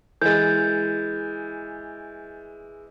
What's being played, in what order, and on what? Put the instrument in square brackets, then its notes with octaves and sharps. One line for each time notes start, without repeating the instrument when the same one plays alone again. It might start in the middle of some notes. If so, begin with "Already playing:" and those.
[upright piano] E3 G#3 [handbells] G6 A6